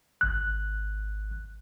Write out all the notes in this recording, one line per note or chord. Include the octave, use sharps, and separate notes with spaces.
G#1 F#6